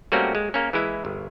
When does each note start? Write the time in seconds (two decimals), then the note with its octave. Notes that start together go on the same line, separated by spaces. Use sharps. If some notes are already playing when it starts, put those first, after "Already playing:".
0.12 G3 A3 A#3 C4 C#4 F#4
0.35 G#3
0.54 A#3 C#4
0.73 E3 G#3 E4
1.05 G1